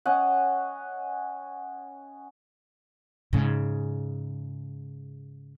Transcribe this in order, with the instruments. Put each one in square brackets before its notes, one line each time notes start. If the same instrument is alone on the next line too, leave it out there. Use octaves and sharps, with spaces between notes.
[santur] C#4 D#5 F#5
[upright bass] G#2 C#3